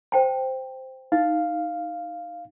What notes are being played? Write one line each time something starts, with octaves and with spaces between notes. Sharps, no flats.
C5 G5 A5
D#4 F5